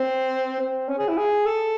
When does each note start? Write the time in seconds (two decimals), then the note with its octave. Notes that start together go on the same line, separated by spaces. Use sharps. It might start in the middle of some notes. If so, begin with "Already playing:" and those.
Already playing: C4
0.61 C4
0.89 C#4
0.98 G#4
1.08 E4
1.17 G#4
1.46 A4